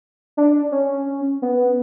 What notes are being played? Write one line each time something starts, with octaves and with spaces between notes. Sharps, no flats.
D4
C#4
B3